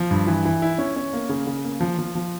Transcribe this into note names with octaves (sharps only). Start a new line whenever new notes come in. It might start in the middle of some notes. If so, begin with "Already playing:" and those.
Already playing: F3
G2
E3
E3
E4
C#4
C#4
A#3
C#3
C#3
A#3
F3
F3
F3